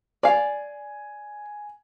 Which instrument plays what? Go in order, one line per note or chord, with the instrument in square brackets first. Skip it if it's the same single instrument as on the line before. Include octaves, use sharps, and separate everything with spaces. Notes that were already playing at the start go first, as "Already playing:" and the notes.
[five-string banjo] D5 F5 [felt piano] G#5